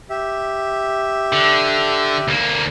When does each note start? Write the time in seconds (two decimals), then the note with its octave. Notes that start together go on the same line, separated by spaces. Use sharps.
0.10 G4 E5
1.33 D3
2.28 D2 A#3